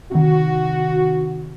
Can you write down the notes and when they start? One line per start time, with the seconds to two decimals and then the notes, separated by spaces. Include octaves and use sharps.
0.12 C3 D#3 F#4